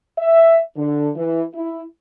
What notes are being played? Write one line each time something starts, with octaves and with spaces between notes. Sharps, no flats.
E5
D3
E3
E4